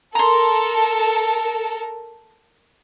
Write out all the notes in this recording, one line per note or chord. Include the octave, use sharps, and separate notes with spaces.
A4 A#4 A#5 C6